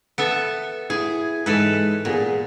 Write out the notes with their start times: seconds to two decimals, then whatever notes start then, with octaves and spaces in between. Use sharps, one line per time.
0.18 B3 A4 E5
0.90 E4 G#4
1.46 G#2 E3 G#3 A4 B4
2.05 A#2 B3 G4 G#4